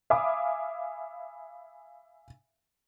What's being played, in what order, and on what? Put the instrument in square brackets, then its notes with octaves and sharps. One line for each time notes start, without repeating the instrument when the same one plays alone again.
[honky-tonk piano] E5 F5 G#5 B5 D6 D#6